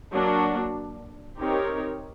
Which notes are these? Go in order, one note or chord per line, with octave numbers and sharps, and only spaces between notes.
F#3 A#3 D4 F#4
C4 D#4 G4 A#4 C#5